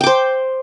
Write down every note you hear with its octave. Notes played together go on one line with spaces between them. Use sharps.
C5 G5 D6